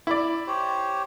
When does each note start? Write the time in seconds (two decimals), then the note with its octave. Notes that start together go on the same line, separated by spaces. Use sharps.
0.07 E4 D5
0.47 G4 C5 C#5